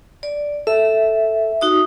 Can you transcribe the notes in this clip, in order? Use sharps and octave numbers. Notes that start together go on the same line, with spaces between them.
D5
A4 E5
D#4 F#4 D#6